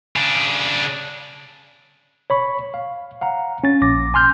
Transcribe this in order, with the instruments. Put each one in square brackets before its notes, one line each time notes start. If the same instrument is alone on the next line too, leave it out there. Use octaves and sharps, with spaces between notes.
[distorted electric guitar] C#3 D4
[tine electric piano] C#5 B5 C#6
F5
F5 F#5 A#5
C#4 A6
A#1 D6 A#6
G#5 C6 F6 G6